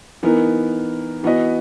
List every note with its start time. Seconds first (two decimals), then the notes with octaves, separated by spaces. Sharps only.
0.23 E3 B3 D#4 A#4
1.23 E3 B3 F#4 B4 D#5